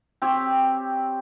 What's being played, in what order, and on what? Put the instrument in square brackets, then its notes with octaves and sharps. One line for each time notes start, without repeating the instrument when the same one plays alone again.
[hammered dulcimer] C4 G4 C#5